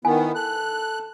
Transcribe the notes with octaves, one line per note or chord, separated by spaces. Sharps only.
D#3 B3 E4 G#5
A4 F#6